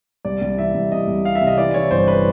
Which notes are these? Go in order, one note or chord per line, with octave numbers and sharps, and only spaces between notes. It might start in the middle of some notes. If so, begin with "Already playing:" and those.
C2 D5
C2
E3 E5
C2
C3 D#5
C2
C3 F5
E5
C3
D#5
E3 D5
E3 C#5
G1 C5
B4